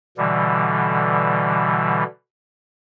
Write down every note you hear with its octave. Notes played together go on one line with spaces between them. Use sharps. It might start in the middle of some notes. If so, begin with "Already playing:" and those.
B2 D3 E3 G3